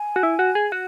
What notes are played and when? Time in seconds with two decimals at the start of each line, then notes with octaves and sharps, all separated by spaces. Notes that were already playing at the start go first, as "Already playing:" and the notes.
Already playing: G#5
0.16 F#4
0.23 E4
0.39 F#4
0.55 G#4
0.72 F#4 F#5